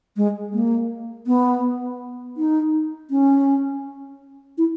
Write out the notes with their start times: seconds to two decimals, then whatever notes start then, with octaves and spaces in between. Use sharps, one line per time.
0.17 G#3
0.54 A#3
1.27 B3
2.37 D#4
3.10 C#4
4.58 E4